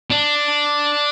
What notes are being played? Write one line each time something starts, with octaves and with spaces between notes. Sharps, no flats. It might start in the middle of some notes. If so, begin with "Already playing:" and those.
D4